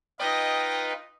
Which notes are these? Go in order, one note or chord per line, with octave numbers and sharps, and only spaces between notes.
D#4 F4 B4 D#5 G5